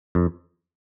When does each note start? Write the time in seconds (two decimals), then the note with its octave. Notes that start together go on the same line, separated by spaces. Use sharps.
0.15 F2